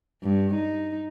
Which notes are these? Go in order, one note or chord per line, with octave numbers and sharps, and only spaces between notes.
G2
D#4